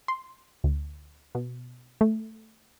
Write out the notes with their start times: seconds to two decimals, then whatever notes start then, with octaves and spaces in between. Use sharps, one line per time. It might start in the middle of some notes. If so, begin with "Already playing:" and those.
0.08 C6
0.64 D2
1.35 B2
2.01 A3